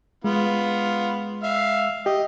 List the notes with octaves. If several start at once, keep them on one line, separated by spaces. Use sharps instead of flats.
G#3 B3 F4
E5 F5
G4 D#5